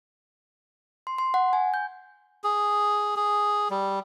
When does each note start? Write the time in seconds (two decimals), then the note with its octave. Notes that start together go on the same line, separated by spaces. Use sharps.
1.07 C6
1.18 C6
1.34 F#5
1.53 G#5
1.74 G6
2.44 G#4
3.16 G#4
3.70 G3